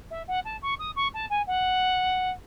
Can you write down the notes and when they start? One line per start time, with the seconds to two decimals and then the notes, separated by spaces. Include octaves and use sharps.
0.10 E5
0.27 F#5
0.44 A5
0.62 C#6
0.79 D#6
0.96 C#6
1.13 A5
1.30 G#5
1.46 F#5